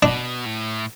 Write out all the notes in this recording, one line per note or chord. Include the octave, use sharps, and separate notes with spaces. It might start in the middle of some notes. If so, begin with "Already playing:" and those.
B2 D4
A2